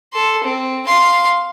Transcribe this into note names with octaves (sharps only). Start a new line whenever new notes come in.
A4 C6
C4
F5 C6